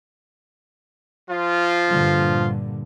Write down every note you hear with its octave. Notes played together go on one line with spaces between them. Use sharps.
F3 F4
G2 A#2 D3